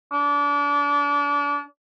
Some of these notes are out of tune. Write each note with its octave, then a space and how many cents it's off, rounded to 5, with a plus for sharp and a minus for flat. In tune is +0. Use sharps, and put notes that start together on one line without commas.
D4 -30